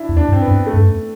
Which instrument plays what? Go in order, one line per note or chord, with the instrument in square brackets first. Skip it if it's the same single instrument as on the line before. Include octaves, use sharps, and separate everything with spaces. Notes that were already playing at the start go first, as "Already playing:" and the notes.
Already playing: [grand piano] D4 E4
[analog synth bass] E2
[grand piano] D4
[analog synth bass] G2
[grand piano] C4
B3
[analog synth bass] G2
[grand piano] A3
[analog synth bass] G2
F#2